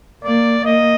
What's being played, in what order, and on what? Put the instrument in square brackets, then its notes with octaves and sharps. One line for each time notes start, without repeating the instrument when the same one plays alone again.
[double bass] A#3 [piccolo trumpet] D5
[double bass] A#3 [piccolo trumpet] D#5